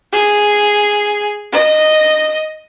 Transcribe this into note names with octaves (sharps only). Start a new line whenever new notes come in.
G#4
D#5